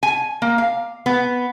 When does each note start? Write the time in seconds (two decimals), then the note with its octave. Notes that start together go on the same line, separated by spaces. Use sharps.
0.03 G#5
0.42 A#3
0.58 F5
1.06 B3